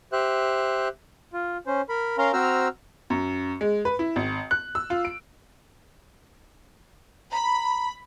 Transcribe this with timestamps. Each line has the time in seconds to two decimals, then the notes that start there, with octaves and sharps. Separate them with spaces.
0.12 G4 C5 E5 F#6
1.33 F4
1.67 C#4 C5
1.89 A#4 B5
2.18 C#4 A#4 F5 A#5 C6
2.33 C4 F#4 C5 A#5 E6 F6
3.10 F#2
3.61 G#3
3.85 B4
3.99 E4
4.16 G#1
4.51 F#6
4.75 E6
4.90 F4
5.05 D7
7.32 A#5 B5